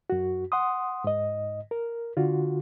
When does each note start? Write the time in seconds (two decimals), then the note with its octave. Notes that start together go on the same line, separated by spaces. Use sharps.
0.10 F#2 F#4
0.52 F#5 C6 D#6
1.04 G#2 D#5
1.71 A#4
2.17 D3 F4 F#4